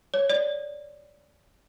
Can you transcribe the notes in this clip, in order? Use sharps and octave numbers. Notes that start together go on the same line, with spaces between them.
C#5
D5